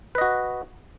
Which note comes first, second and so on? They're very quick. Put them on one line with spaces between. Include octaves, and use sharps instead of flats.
B4 D#5 F#4